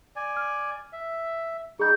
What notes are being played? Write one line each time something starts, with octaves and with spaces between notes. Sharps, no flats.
D5 G#5
F6
E5
G3 D#4 G#4 G6